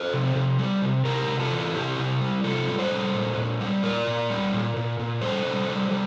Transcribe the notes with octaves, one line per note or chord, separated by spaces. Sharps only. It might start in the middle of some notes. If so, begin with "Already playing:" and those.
Already playing: A4 C5
C3
C3
G3
C3
C3 G4 A#4
C3
F4 A4
E3
C3 E4 G4
C3
G3
C3 F4 A4
G3
A4 C5
G3
A#2
A#2
G3
A#2 A#4 D5
A#2
G3
A#2
A#2
A#2
G3 A4 C5
G3
G3
G3